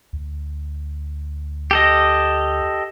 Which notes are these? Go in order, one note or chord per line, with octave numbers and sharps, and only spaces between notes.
D2
G4 A4 D#5